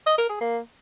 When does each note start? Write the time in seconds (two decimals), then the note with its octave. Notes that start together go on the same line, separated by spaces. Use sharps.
0.07 D#5
0.18 A#4
0.29 G#4
0.41 A#3